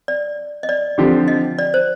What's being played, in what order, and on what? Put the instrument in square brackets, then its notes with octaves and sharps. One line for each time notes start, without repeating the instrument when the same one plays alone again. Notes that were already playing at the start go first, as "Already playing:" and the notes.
[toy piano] D5
D#5
D5
[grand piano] D3 F3 C4 G4
[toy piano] D#5
D5
C5